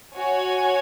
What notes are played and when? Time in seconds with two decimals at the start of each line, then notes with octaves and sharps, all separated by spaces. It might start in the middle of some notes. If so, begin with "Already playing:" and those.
0.15 F#4 C#5 G#5